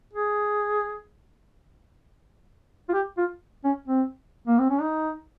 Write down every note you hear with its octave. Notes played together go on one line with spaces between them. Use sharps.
G#4
F4
G4
F4
C#4
C4
A#3
C4
C#4
D#4